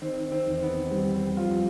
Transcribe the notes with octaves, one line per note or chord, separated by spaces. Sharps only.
D#3 C4
C4
E2
B3
G3 C4
C4
F2 F4